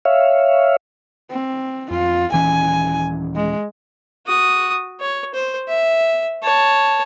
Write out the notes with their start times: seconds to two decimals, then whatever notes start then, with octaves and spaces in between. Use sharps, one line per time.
0.05 C#5 E5 F5
1.31 C4
1.91 F2 F4
2.32 D#1 E3 C#4 G#5
3.36 G#3
4.26 F#4 D#6
5.00 C#5
5.34 C5
5.69 E5
6.43 C#5 A5